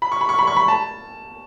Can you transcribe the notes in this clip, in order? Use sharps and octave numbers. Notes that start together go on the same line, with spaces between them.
B5
C#6
B5
C#6
B5
C#6
B5
A5